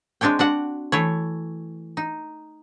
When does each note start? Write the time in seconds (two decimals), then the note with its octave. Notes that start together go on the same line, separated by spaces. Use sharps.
0.21 G#3 C4 D4 C#5 G5
0.39 D4 F#4 F#5
0.92 E3 A3 C#5
1.97 D#4